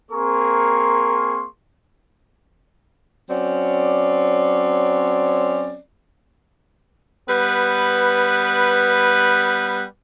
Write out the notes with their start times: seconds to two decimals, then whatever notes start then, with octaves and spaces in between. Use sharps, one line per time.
0.11 A#3 C4 G#4 A#4 C6 C#6
3.30 F#3 C4 C#4 D5
7.28 G3 B3 B4